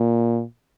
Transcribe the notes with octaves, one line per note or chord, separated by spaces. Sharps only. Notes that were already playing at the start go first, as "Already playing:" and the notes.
Already playing: A#2